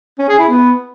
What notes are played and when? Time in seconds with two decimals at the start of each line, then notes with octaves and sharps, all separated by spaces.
0.19 C#4
0.29 G#4
0.39 E4
0.49 B3